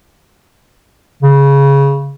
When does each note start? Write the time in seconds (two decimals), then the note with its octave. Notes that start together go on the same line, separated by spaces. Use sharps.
1.23 C#3